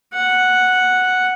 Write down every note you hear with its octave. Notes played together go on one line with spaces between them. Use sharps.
F#5